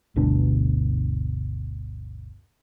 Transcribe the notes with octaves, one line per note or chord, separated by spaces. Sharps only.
G1 D2 B2 D4